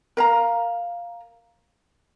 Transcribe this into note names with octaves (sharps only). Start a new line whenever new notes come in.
A#4 F5 A#5